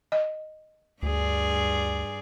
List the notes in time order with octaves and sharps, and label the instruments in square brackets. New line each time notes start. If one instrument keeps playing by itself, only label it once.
[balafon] D#5
[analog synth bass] D2 [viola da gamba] G2 G#4 D5